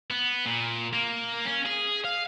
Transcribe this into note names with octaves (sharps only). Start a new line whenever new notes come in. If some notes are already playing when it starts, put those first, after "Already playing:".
B3
A#2
A#3
C#4
G#4
F5